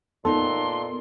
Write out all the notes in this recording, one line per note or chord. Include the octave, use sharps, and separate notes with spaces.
A#2 B3 D#4 A4 C6